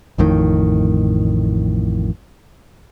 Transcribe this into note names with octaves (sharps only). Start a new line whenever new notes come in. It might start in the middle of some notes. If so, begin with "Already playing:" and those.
A1 F2 A2 D#3